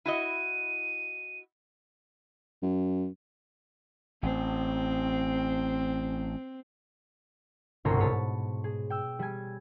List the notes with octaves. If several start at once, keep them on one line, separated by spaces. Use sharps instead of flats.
E4 F#4 D#5 D#7
F#2
A1 C4
G1 C2 B2 C#5 A#5 C6
G#2 B4 C#5 A5
G#4
G5 E6
G3 G#5